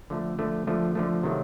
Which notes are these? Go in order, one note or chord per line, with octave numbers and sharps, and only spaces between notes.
D3 F3 A3
D3 F3 A3
D3 F3 A3
D3 F3 A3
C3 D#3 F#3 A3